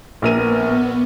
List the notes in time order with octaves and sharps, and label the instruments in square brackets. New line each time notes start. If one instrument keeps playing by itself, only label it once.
[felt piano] A#1 A#4 D#7 [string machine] B3